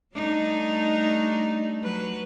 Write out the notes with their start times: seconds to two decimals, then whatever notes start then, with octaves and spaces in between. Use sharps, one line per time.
0.15 G3 A3 D4 D#4
1.83 F#3 B4